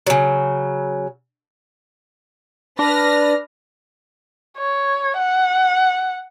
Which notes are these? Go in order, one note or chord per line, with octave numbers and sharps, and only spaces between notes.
C#3 F#3
D4 B4 F6 A#6
C#5
F#5